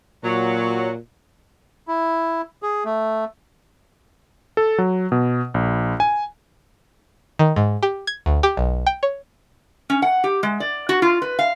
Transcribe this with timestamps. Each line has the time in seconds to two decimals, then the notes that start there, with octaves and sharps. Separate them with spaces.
0.24 A#2 F#3
1.88 E4
2.63 G#4
2.85 A3
4.57 A4
4.78 F#3
5.12 B2
5.54 A#1
6.00 G#5
7.39 D#3
7.56 G#2
7.83 G4
8.07 G#6
8.26 D2
8.43 G4
8.57 B1
8.86 G5
9.03 C#5
9.90 C#4
10.02 F#5
10.24 G4
10.43 G#3
10.60 D5
10.89 F#4
11.02 F4
11.22 B4
11.39 F5